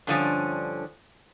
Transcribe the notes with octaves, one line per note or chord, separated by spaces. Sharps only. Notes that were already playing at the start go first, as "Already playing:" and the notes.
G2 D3 F3 C#4